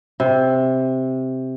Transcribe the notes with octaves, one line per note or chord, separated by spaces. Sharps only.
C3